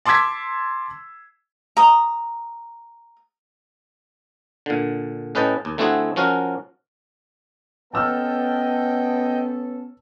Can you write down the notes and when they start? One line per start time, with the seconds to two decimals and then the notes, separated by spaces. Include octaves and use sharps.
0.06 A5 C6 D6 E6 G#6 B6
1.77 A#5 D#6
4.66 A#2 D3
5.35 A2 C#4 B4 D#5 G5 A5
5.65 D#2
5.78 D3 A3 C4 E4 F#4 G#4
6.16 F3 C#4 F#4 A#4 F5
7.94 B3 C#4 A4 D#5 G5 A5 E6 F6